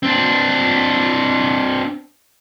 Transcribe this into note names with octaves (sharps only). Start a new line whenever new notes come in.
C4 D4